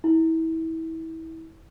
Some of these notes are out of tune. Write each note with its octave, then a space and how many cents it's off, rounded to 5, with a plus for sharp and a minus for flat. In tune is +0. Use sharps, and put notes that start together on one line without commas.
E4 -30